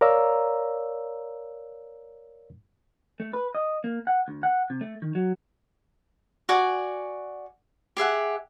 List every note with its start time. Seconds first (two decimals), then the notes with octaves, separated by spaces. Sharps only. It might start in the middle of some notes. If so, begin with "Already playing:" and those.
0.01 A#4 C#5 D5 F5 A#5 E6
3.20 A3
3.33 B4
3.55 D#5
3.84 A#3
4.07 F#5
4.28 D2
4.43 F#5
4.70 C3
4.81 A3
5.02 D#3
5.15 F#3
6.49 F#4 D5 G#5
7.97 G4 G#4 E5 F#5